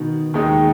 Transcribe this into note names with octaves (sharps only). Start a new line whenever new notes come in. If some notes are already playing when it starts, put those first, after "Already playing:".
Already playing: B2 D#3
D#2 D#3 G#3 D#4